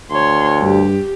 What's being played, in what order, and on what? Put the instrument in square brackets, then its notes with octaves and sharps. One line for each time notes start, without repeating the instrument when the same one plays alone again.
[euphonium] D2 [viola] C#5 C6
[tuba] G2 [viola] G4